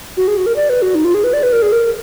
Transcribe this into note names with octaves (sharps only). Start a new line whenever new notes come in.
F#4
G#4
F#4
A#4
D5
B4
F#4
D#4
F4
G#4
B4
D5
B4
A#4
G#4
A#4